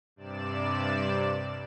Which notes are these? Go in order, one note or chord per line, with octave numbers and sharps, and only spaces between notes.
G2 C3 D5 E7